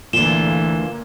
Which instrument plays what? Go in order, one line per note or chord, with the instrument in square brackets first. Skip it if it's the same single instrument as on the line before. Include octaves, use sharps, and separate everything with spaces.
[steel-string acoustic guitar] D2 F4 [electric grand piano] A#2 A#3 [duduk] E3 [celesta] E7 G7